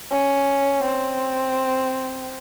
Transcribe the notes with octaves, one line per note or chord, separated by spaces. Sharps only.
C#4
C4